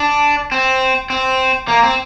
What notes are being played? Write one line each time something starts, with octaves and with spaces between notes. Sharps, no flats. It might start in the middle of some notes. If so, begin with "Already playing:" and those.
Already playing: D4
C4
C4
A#3
C4